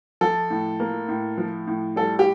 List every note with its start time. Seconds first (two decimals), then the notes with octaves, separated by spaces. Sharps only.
0.21 F3 A4
0.50 A2
0.80 A#3
1.08 A2
1.38 F3
1.67 A2
1.96 G3 A4
2.19 G4